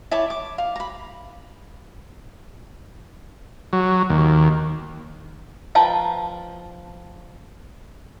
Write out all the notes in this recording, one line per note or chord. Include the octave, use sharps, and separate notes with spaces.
E4 C#5 A5 D6
D6
F5
A#5 B5
F#3
D#2
F3 B4 G5 A5 A#5